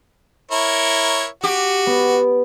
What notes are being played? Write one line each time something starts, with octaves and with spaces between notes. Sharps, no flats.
E4 A#4 C#5
F#4 G4
B3